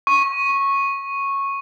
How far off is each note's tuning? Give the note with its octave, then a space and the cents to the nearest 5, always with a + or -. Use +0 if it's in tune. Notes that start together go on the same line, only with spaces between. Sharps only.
C#6 -10